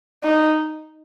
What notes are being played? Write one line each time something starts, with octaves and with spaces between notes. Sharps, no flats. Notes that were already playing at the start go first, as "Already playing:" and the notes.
D#4